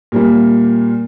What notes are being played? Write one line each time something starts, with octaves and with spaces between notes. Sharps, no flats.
A#2 G3 A#3